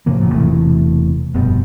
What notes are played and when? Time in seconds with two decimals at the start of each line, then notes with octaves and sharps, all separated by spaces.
0.06 A2 C#3 F3 A#3
0.20 G1 F#2 A#2
0.33 E1 C3 E3 A3
1.34 F1 G2 B2 G3